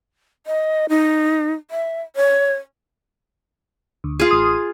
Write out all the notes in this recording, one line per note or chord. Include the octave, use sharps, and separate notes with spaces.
D#5
D#4
E5
C#5
D2
F4 G#4
A1 D#6